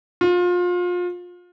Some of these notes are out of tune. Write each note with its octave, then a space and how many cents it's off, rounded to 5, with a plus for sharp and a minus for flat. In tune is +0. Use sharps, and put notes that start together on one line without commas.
F4 +30